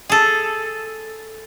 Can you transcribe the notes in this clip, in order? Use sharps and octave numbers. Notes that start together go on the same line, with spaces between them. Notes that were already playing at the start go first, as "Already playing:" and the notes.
G#4 A4